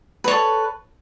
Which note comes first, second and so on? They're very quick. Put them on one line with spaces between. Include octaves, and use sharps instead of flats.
B4 C#5 A4